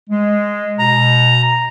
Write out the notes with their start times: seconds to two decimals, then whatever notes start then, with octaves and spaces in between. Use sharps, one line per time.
0.10 G#3
0.79 B2 A#5